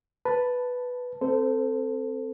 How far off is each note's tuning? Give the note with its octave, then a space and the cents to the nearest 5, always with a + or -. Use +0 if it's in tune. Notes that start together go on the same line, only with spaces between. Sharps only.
B4 +0 A5 +0
C4 +0 A4 +15 C5 -25